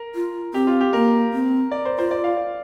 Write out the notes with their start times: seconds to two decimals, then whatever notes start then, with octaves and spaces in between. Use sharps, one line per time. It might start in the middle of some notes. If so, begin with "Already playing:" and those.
Already playing: A#4
0.15 F4
0.54 C4 G4
0.67 F4
0.81 G4
0.93 A#3 A#4
1.33 C4
1.71 D5
1.85 C5
1.98 F4 C5
2.11 D5
2.24 F5
2.37 D5